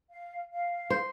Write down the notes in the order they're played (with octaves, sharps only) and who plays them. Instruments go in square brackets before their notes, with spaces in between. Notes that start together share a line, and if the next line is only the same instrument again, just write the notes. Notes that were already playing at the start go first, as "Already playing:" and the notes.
[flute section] F5
F5
[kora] C5